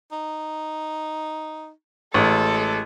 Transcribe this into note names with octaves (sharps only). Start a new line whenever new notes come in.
D#4
A1 G#3 A4